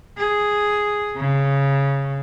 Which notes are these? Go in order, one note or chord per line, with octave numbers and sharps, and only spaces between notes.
G#4
C#3